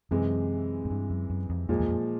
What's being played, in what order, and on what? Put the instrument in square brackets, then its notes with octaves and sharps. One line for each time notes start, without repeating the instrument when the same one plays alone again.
[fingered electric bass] F#2 [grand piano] C3 E3 G#3
[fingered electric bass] G#2
G2
F#2
F#2
F2
[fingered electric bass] F2 [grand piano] A#2 F3 G#3
[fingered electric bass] E2
F2